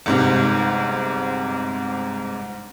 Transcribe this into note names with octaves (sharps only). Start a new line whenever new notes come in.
G1 G#2 C3